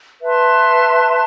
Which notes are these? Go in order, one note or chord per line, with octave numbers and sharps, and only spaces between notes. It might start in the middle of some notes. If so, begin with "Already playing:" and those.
B4 E5 A5 C6